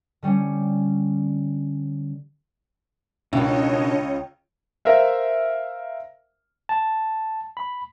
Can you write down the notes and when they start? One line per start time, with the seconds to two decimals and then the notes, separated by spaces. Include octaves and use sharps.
0.23 D3 G3 C#4
3.33 C#2 B2 D#3 D4 C#5 D#5
4.85 A#4 C5 E5 F5
6.69 A5
7.57 B5